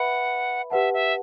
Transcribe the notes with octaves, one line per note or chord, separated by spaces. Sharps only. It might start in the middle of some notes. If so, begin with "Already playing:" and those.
Already playing: B4 E5 F#5 B5
G4 B4 E5 F#5 A5
E5